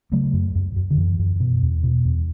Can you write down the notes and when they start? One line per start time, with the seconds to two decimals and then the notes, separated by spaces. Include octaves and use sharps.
0.12 C#3 F#3 A3
0.33 F#2
0.55 F#2
0.76 F#2
0.90 D3
0.97 F#2 E3
1.19 F#2
1.40 B2
1.62 E2
1.83 B2
2.05 E2